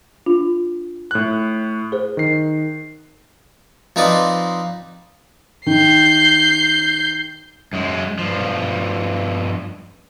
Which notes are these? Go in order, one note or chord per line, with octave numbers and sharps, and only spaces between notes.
D4 F4
A2 F#6
G#4 C5
D#3 C7
F3 C4 D#4 B4 D5
D#3 G6 C7
F#2 G#3
G2 F3